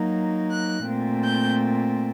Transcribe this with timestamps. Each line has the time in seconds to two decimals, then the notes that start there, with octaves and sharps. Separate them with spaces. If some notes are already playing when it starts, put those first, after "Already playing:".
Already playing: F#3 A#3 D#4
0.51 F#6
0.87 A#2 A3 C4
1.24 G6